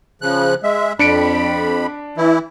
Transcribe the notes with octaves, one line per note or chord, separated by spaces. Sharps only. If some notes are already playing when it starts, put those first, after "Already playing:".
C#3 F3 F#6
G#3 E5
F2 D4 B5 C#7 D7
E3 E4